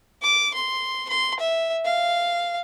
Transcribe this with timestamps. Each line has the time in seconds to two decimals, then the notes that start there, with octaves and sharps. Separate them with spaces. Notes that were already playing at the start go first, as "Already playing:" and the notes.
0.22 D6
0.54 C6
1.09 C6
1.40 E5
1.85 F5